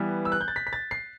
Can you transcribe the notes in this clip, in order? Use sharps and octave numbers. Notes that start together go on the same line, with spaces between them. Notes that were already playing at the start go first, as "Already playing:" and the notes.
Already playing: E3 G3 B3
E6
F#6
G6
A6
B6
B6
A6
C7